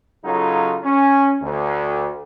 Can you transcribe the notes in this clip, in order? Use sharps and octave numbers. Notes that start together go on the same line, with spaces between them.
C#3 F#3 D#4 F4 A4
C#4
D2